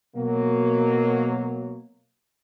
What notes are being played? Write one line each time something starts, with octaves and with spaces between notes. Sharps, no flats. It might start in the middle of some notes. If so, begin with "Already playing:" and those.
B2 F#3 A#3